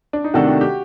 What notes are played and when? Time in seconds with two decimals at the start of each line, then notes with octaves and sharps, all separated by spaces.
0.13 D4
0.24 D#4
0.34 C3 D#3 A3 D4 F#4 A4
0.47 F#4
0.61 G4